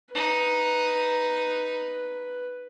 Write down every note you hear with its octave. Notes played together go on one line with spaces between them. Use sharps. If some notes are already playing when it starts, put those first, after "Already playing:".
D#4 B4